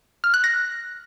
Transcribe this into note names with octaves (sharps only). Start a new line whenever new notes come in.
F6
F#6
A#6